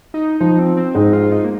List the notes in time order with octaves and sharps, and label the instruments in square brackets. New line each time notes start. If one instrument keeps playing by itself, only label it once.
[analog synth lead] D#4
[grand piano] F3 [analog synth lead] D#4
[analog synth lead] C4
C4
[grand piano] G#2 G#3 [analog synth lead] D#4
[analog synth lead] F4
D#4
A#3